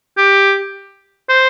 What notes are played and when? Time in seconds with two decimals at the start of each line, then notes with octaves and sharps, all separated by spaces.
0.17 G4
1.29 C5